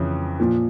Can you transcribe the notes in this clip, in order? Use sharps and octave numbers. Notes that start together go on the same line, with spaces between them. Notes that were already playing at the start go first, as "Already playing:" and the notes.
Already playing: F2 C#3 E3
A#2 F3